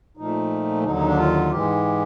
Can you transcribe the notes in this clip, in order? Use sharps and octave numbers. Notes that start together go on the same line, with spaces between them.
A#2 F3 A3 D#4
D#2 D3 F#3 D#4
D#4
D4
F4
G#2 E3 G#3 G4